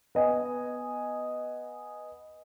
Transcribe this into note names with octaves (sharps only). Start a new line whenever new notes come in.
B3 D#5 G#5